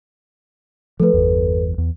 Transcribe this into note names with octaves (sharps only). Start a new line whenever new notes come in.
F3 A3 A4 B4
G1 E2
E2